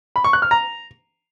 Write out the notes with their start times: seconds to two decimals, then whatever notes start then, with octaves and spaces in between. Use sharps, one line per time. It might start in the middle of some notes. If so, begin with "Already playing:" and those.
0.16 B5
0.24 C#6
0.33 F#6
0.42 F6
0.51 A#5